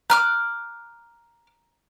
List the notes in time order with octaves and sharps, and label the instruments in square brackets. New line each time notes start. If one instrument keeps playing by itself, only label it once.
[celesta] A#5 [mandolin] D6 F6 F#6